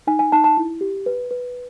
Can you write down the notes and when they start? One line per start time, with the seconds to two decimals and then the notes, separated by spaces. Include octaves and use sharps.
0.07 D#4 G#5
0.19 G#5
0.32 D#4 A5
0.44 A5
0.57 E4
0.81 G4
1.06 B4
1.31 B4